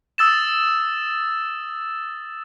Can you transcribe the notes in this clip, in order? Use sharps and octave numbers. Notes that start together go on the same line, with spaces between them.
D#6 E6 A6 E7